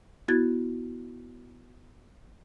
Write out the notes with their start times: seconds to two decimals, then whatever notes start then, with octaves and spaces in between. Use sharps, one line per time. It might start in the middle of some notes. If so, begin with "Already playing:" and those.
0.28 B3 E4 F#4 G#6 A6